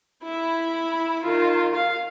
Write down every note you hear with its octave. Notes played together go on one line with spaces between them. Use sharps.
E4 B5
D#3 F4
F5